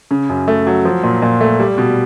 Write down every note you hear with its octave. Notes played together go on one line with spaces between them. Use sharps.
C#3
F#2
A3
F#3
F3
A#2
A#2
A3
G3
B2